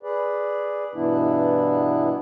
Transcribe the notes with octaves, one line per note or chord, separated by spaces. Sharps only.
G#4 B4 D5
G2 B2 E3 B3 D4 E4